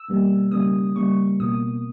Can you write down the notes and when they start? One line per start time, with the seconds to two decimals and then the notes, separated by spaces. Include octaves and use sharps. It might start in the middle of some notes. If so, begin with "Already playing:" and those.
Already playing: E6
0.08 B2 G3 A#3
0.51 C#3 G3 A#3 D#6
0.96 C#3 G3 A#3 C#6
1.40 B2 A#3 D#6